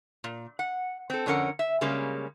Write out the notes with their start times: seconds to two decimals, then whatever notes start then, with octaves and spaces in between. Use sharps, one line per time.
0.24 A#2
0.59 F#5
1.10 C4 A4
1.26 F2 D3 C#4 A#4 F#5
1.59 E5
1.81 C#3 G3 G#3 A#3 C#4